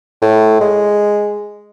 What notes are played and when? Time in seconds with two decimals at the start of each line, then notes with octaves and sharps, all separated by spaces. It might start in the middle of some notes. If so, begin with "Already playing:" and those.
0.22 A2
0.60 G#3